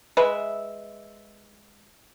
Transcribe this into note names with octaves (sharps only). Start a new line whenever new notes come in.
G#3 B4 E5